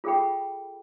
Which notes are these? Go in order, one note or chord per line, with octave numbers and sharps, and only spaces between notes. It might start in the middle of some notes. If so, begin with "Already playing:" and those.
F4 G#4 A4 F#5 G5 B5